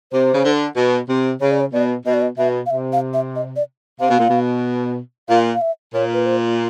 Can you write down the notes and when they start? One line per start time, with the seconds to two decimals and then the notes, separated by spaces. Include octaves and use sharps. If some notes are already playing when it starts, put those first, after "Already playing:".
0.12 C3 C5
0.34 C#3
0.45 D3
0.76 B2
1.09 C3
1.41 C#3 C#5
1.51 D5
1.61 C#5
1.73 B2 D5
2.05 B2 D#5
2.14 D5
2.22 D#5
2.38 B2 E5
2.66 F5
2.70 C3 E5
2.93 F5
3.14 E5
3.36 D#5
3.56 D5
4.00 C3 F5
4.09 B2
4.19 A#2
4.28 B2
5.29 A#2 F5
5.55 F5
5.61 E5
5.94 A#2 C#5
6.14 B4
6.26 C5